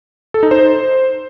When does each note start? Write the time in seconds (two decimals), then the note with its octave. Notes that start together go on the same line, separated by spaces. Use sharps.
0.34 A4
0.43 D#4
0.51 C5